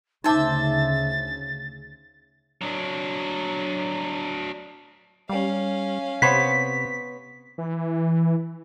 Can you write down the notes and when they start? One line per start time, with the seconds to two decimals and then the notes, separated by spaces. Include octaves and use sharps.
0.24 D2 C#3 D#4 C5 E5 A5 D6 A6
2.62 F#3 D4
5.29 G3 C#4 F5
6.22 C3 B3 C5 C#5 B6
7.58 E3